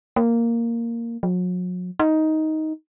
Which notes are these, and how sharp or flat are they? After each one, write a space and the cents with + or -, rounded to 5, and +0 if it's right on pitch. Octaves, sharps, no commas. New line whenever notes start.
A#3 -5
F#3 -40
D#4 +10